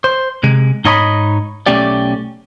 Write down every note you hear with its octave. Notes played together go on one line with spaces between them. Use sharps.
C5
C3 G#3
G#2 D#4 C#5 D#5 A#5 B5
B1 A3 C#4 G4 D5